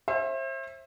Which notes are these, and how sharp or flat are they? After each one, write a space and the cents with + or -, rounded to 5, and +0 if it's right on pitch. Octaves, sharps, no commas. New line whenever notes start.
C5 +40 E5 +0